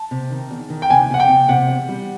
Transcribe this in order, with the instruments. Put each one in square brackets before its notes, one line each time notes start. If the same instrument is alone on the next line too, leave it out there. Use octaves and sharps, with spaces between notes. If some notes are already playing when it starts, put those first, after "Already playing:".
Already playing: [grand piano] A5
[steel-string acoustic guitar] C3
D#3
E2
D#3
[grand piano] G5
[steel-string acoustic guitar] C3 [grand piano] G#5
[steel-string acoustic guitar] C3 [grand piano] F#5
[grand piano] G5
[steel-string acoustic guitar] C3
[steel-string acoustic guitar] C3 [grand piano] F#5
[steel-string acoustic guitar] E2
G3